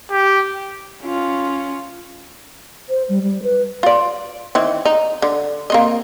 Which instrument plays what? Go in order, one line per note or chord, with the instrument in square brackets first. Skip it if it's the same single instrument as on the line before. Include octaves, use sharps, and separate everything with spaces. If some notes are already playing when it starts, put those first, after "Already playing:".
[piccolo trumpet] G4
[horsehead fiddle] C#4 F4
[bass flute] C5
G3
G3
B4
[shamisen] F4 D5
D#3 E3 C4
D#4
D3
A#3 C4 D#5